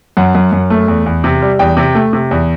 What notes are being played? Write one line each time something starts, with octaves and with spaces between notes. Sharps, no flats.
F#2 F#5
F#2
F#2
A3
E2
E2
C3
G3
E2 G5
C3
A3
C3
E2